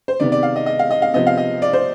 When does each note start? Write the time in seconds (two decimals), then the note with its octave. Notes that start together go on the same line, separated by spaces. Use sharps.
0.08 C5
0.20 C3 D#3 B3 D5
0.32 D5
0.43 F5
0.56 D#5
0.66 D#5
0.79 F5
0.91 D#5
1.02 F5
1.14 C3 F3 B3 D#5
1.27 F5
1.38 D#5
1.62 D5
1.73 C5